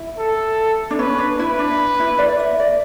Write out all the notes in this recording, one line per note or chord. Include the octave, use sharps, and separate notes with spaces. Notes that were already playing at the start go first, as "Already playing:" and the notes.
Already playing: E4
A4
D4
C#4 B4
D4
E4 B4
D4
E4
D5
D5
E5
D5